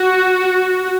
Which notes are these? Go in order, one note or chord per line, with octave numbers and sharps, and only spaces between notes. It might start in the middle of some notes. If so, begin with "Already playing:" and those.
Already playing: F#4